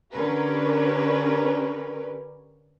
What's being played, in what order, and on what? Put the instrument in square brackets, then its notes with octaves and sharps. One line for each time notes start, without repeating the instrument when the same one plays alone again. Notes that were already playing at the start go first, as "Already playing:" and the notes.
[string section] D3 C#4 G4 A#4 B4